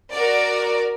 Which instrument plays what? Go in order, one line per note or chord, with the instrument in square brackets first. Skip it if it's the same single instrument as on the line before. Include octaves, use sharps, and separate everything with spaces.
[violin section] F#4 A#4 D5